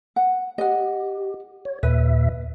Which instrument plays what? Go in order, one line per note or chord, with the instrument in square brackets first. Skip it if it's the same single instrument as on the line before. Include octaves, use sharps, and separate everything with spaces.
[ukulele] F#5
[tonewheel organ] G4 [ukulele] D#5 F#5
[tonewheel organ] C#5
[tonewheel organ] D#2 A#2 E5 [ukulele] B4